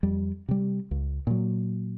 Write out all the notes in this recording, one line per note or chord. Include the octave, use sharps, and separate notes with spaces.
F2 G3
C3 G3
C#2
A#2 F#3